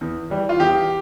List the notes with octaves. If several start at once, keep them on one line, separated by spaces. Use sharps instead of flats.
E2
E3 G3
F4
E2 G4